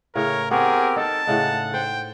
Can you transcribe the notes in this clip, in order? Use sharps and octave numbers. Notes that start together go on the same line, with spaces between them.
A2 C#3 A#4 C#5
B3 C4 G4 G#4 A#4 C#5
D#4 A4 A#4 A5
A2 C#3 D#4 F#5
C5 G5